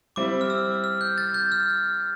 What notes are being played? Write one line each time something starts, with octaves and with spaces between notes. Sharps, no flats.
G3 C4 E4 D6
F6
E6
F6
G6
A6
G6
F6